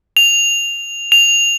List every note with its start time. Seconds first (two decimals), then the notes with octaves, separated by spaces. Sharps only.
0.17 F7
1.12 F7